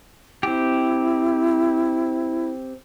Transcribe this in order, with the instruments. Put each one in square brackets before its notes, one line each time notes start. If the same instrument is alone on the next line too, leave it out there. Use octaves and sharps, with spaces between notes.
[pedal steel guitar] C4 G4 [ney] E4